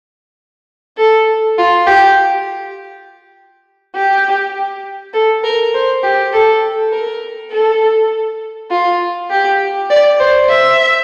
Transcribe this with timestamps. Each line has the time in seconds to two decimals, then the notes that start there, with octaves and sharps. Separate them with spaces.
0.97 A4
1.58 F4
1.87 G4
3.96 G4
5.14 A4
5.44 A#4
5.74 C5
6.03 G4
6.33 A4
6.92 A#4
7.51 A4
8.71 F4
9.30 G4
9.90 D5
10.20 C5
10.49 E5